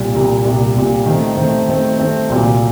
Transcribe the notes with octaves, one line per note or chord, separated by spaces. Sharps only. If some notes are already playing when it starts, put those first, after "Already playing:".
Already playing: C2 A#2 G3
C2 A#2 G3
C2 A#2 G3
C2 A#2 G3
D#3 A3 C4
D#3 A3 C4
D#3 A3 C4
D#3 A3 C4
C2 A#2 F#3